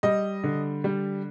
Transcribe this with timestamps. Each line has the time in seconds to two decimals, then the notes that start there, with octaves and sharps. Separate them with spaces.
0.03 G3 D#5
0.44 D3
0.84 G3